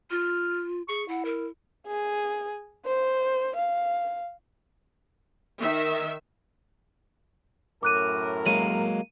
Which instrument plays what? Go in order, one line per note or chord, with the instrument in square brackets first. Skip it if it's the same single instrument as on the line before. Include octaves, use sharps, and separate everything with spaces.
[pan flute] F4 [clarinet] F6
[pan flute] G#4 [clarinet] C#6
[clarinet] E4 [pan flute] F#5
[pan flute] A#4
[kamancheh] G#4
C5
F5
[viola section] D#3 E5
[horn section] F#2 A2 A#4 [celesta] D6 F#6 D#7
[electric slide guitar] F#3 G#3 A#3 [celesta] D#7